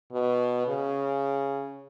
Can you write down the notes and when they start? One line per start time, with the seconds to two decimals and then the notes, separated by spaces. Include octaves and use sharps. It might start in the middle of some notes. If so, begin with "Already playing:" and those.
0.12 B2
0.67 C#3